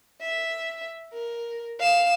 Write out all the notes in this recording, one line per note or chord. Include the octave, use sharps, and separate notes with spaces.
E5
A#4
F5 E7